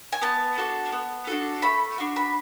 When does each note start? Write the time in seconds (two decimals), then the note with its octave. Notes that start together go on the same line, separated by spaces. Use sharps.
0.12 G#5
0.22 B3 A5
0.58 D4 F#4 A4
0.92 B3
1.27 D4 F#4 A4
1.62 A3 B5
1.98 D4 F#4
2.16 B5